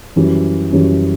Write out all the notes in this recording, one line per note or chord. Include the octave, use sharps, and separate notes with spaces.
F#2 E3 G3 C#4
F#2 E3 G3 C#4